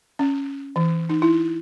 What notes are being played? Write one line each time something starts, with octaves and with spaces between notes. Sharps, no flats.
C#4
E3
D#4
E4